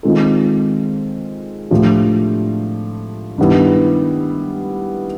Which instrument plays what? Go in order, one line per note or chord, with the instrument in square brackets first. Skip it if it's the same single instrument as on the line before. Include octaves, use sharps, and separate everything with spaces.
[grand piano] D#3 G#3 C4 F4 A4
A2 F3 A3 D4 G4
G2 D#3 G3 B3 E4